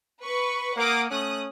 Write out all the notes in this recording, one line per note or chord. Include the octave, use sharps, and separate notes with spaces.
B4 C#6
A#3 F#5 D6 D#6
A3 C#4 D#6 F#6